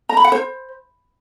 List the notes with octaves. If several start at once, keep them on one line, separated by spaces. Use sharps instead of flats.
A#5
B5
F#5
C5